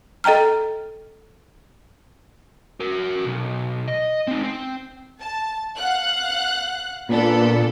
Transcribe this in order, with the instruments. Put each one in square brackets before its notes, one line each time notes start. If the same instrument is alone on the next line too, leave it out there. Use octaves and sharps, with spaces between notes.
[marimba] A4 D#5 G5 A#5 F6
[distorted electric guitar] F#4 A#4
B1
D#5
C4 D#4
C4
[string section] A5
F5 F#5 F#6
[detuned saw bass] A#2 [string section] B3 D4 A4